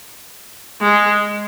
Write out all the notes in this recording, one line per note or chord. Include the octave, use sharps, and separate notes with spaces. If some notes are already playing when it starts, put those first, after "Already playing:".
G#3